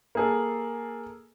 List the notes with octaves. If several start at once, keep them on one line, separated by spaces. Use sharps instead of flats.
A#3 G#4 A4